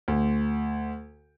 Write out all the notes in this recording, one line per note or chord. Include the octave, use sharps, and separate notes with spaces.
D2